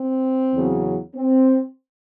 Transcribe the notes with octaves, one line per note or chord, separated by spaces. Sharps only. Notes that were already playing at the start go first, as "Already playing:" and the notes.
Already playing: C4
E2 C#3 F#3
C4